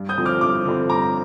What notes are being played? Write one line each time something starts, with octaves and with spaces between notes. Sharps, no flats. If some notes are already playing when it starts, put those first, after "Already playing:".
Already playing: G2
D#6 G6
D3 F3 C4
D6 F6
G2 D6 F6
D3 F3 C4
G2 A#5 D6